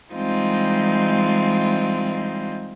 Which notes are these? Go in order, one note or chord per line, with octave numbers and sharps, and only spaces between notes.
E3 G3 G#3 C4 D#4 F4